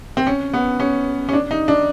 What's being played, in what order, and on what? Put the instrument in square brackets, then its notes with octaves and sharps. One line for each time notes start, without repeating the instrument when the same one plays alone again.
[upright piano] C4
C#4
B3
C#4
C#4
D4
D#4
D4